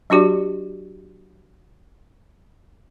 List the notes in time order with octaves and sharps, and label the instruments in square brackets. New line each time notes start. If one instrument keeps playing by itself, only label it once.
[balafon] F#3 D4 F#4 G4 D5